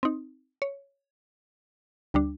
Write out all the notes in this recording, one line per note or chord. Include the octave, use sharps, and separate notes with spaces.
C4 D#4
C#5
D2 G3 D4